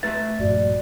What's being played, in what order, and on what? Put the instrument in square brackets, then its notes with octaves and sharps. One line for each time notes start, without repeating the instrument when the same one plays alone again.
[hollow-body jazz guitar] A3 B4 E5 [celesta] A6
[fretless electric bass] A#1 G2 [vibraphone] F#4 D5